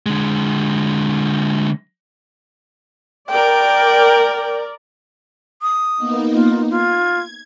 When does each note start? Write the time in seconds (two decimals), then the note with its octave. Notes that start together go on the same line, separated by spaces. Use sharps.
0.06 D3 G#3
3.30 A#4 D5 G5
5.62 D#6
5.97 A#3 B3 D#4
6.33 F4
6.70 F4 G#6